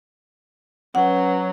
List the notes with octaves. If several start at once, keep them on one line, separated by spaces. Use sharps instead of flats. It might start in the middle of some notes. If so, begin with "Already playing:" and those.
F#3 C#4 B4 F#5